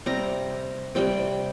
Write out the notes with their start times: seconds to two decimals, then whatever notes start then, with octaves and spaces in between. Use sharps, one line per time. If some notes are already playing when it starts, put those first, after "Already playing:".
0.06 C3 G3 C4 A#5
0.95 C3 G3 C4 G5